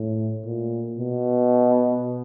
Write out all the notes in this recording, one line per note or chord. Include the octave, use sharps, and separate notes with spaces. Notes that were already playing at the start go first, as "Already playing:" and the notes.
Already playing: A2
A#2
B2